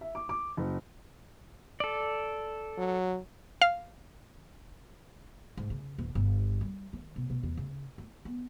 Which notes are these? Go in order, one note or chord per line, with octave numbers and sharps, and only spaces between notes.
E5
D6
D6
F#1
A4 D5
F#3
F5
G#2
C#3
D#1
G1
G3
D#3
B2
B2
E2
C#3
E4
B3